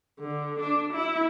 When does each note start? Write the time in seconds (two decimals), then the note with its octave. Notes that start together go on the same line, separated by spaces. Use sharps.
0.20 D3
0.60 D4
0.93 E4